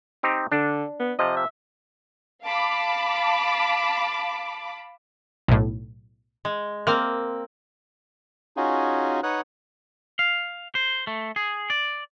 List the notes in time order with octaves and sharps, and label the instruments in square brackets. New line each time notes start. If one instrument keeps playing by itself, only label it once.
[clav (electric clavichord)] C4 D#4 G4
[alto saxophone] D3 [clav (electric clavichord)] D4
[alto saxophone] B3
[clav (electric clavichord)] C3 F3 [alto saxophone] D#5
[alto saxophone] E5
[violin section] F5 A5 B5 D6
[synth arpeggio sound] B1 A2
[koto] G#3
[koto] A#3 C4 [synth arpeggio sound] F6
[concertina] C#4 D#4 F4 F#4 G#4
D#4 B4 C#5 F#5 D#6 F#6
[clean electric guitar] F5
C5
A3
G#4
D5